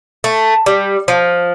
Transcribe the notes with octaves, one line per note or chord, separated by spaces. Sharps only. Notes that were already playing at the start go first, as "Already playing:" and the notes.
A3
G3
F3